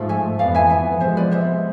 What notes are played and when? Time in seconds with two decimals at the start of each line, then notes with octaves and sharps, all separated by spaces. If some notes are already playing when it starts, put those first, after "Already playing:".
Already playing: G#2 F3 A3
0.09 E5 G#5
0.39 F2 E3 B3 D5 F5
0.55 E5 G#5
0.70 E5 G#5
1.00 C3 F3 G#3 B3 C5 E5
1.17 B4 D5
1.32 C5 E5